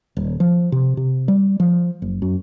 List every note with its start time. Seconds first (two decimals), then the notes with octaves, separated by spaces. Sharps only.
0.17 D#1
0.40 F3
0.72 C3
0.97 C3
1.28 G3
1.60 F3
2.02 F#1
2.22 F#2